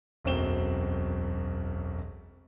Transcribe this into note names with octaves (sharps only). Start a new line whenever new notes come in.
E1 B1 F#2 C4 E7 G7